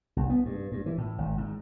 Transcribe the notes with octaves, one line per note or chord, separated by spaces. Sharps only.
C2
B3
G2
G2
E3
A2
G#1
G#2